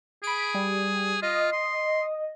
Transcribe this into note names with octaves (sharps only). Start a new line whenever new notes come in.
G#4 B5 D7
G3
F4 D#5
C6